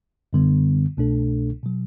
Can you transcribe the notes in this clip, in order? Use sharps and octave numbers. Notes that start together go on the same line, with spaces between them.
F#2 D3 G3 B3
C2 B2 A3 D4 A4
B2 F#3